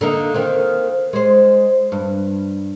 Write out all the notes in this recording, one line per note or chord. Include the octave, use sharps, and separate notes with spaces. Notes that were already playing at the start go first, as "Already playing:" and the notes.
D3 A#3 D#4
D#3 A#3 C4
G#3 C5
G2